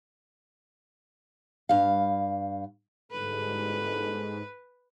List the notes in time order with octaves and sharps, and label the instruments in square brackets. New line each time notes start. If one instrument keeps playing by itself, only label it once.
[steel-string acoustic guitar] G2 F5
[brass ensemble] G1 G3 A4 [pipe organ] G#2 [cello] B4